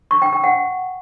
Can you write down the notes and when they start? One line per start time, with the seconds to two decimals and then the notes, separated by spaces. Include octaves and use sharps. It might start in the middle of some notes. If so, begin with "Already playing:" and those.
0.11 C#6
0.22 G5
0.33 G5
0.44 F#5